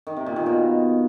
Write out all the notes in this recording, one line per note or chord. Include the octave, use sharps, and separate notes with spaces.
D#3
C3
A#2
D#3
B2